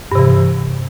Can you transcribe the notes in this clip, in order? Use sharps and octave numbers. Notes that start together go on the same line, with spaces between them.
G2 C3 E3